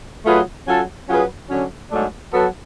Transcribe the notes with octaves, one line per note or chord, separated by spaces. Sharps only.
F#3 A3 F4 G#4 B4
F#3 C#4 F4 A4
F#3 C#4 F4 G#4 B4
D3 F#3 C#4
G#2 F#3 A3 D4
F#3 B3 F#4 A4